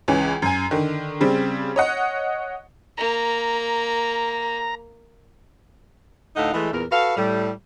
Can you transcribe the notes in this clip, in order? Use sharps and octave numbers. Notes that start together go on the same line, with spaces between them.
C#2 E3 C#4
F#2 G#5
D3 D#3
C#3 G3 C4
C#5 D#5 F#5
A#3 A#5
D2 A2 D#4 D#5 F5 F#5
E3 G#3 A3
E2 A#2 A#4
F#4 A4 B4 F5
A2 G3